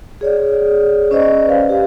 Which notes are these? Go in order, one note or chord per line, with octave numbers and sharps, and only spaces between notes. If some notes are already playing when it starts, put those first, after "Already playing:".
G#4 C#5 D5
C#4 C5 D5 D#5
B4 F5
G4